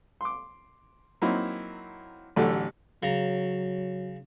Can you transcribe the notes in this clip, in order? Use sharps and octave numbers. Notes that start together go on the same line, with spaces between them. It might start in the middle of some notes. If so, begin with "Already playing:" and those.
C6 D6
F#3 A#3 C4 D#4 E4
A1 D3 F#3 A3 G4
C#3 F#3 A#5